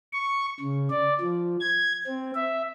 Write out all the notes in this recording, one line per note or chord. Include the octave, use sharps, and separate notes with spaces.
C#6
C#3
D5
F3
G#6
C4
E5